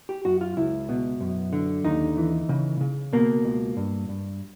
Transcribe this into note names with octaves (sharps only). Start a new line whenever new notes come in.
G4
F#2 F#4
F4
C#2 E4
B2
F#2
D3
D#2 D#4
E3
C#3
C#3
B2 A#3
C#2
G2
G2